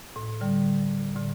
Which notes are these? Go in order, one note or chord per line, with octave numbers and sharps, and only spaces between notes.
A2
D3 G3
A2 D3